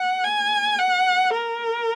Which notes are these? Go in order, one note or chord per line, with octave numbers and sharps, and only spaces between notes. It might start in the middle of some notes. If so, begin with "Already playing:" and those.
Already playing: F#5
G#5
F#5
A#4